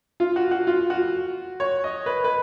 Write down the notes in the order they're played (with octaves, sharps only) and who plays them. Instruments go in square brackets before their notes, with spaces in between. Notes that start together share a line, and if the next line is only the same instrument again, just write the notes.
[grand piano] F4
F#4
F#4
F4
F#4
C#5
D#5
B4
B4